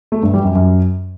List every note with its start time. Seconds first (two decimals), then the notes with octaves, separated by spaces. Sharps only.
0.12 A3
0.23 G2
0.34 G3
0.44 F#2
0.55 F#2